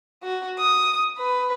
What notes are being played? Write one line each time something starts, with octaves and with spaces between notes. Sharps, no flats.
F#4
D#6
B4